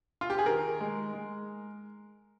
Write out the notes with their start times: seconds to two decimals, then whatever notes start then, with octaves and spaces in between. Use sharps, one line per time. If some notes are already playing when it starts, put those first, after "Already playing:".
0.21 F4
0.30 G4
0.39 G#4
0.46 D#3 A#4
0.81 G#3
1.13 G#3